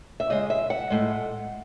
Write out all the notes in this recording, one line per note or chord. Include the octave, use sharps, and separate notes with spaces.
E5
C#3 G#3 D#5
E5
F#5
A2 G#3